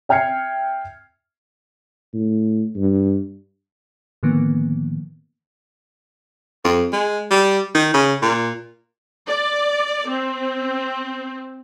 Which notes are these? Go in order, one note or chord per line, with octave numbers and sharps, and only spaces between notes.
E5 G5 F6 G#6 C7 C#7
A2
G2
A2 D3 D#3 F3 A#3 B3
F2
G#3
G3
D#3
C#3
A#2
D5
C4